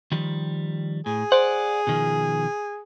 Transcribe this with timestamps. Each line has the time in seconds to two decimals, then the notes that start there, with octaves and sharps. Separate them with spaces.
0.12 D#3 F3 G3
1.06 A2 G#4
1.32 C5 D5 F#5
1.87 B2 D#3 F3